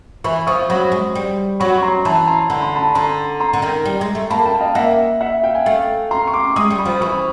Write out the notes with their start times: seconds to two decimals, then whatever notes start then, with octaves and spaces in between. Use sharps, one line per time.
0.24 E3 B5 C#6
0.47 F3 C#6 D#6
0.70 F#3 B5 C#6
0.92 G#3
1.15 G3
1.60 F#3 B5 C#6
1.78 C#6
1.83 A#5 C6
2.05 E3 A5 B5
2.28 A#5 C6
2.50 D3 B5
2.63 C6
2.76 A5 B5
2.95 D3 A#5 C6
3.40 A#5 C6
3.53 D3
3.62 D#3
3.85 G3
4.01 G#3
4.15 A3
4.30 A#3 A5 B5
4.46 G5 A5
4.60 D#5 F5
4.75 A#3 E5 F#5
5.21 E5 F#5
5.43 F5 G5
5.55 G#5
5.66 A3 F5 G5
6.11 A#5 C6
6.27 C#6
6.33 C6 D6
6.56 G#3 C#6 D#6
6.70 G3
6.78 B5 C#6
6.85 F3
7.01 E3 B5 C#6